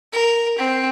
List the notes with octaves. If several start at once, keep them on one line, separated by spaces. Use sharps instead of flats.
A#4
C4